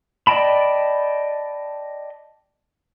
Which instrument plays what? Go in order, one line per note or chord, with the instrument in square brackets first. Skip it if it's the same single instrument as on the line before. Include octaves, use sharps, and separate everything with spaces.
[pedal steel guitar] D5 D#5 G5 A5 B5